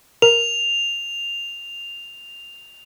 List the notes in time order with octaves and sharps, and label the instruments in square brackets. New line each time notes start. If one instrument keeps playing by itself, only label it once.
[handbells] A#4 [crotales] F7